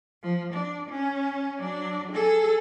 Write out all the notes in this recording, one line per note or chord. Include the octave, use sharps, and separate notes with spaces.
F3
D4
C#4
F#3 D4
G#4 A4